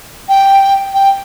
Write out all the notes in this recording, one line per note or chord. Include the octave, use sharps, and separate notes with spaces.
G5
G5